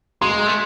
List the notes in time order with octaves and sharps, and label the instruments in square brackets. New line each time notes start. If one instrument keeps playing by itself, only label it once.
[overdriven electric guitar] G#3 [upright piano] C6
[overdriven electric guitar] A3